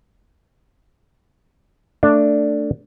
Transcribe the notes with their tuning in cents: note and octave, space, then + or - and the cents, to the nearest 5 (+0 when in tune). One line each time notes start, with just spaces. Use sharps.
A3 +15 D4 +0